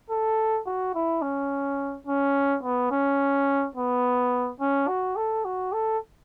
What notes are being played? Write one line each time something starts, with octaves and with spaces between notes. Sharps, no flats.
A4
F#4
E4
C#4
C#4
B3
C#4
B3
C#4
F#4
A4
F#4
A4